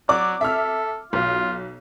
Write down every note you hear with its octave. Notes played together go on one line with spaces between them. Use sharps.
F#3 D5 D6
A4 E5 F6
B1 F4